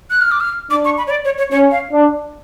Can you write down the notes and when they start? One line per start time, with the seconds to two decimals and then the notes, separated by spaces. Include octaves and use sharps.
0.10 F#6
0.21 F6
0.31 D6
0.40 F6
0.70 D4 D6
0.85 C#6
0.98 B5
1.07 C#5
1.11 D5
1.25 C#5
1.38 C#5
1.51 C#4 C#5
1.71 F5
1.92 D4